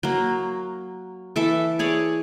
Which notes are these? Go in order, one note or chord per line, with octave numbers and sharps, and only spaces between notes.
F#3 A#3
E3 A4 E5 D6
G#4 C#5 D5